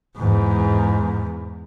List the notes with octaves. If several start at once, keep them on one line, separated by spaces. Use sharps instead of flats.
E2 G#2